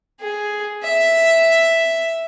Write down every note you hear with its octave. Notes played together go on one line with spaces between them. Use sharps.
G#4
E5